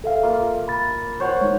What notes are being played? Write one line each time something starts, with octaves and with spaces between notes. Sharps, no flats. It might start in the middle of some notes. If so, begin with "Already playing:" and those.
A4 E5 F5
A#3 F4
B5 A6
C5 C#5 F#5
G#3 D#4